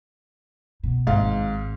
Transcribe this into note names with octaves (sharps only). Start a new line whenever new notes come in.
B2
G#1 G#2 F5